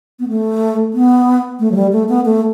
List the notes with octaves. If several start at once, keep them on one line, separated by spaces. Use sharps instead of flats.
B3
A3
B3
A3
F#3
G3
A3
B3
A3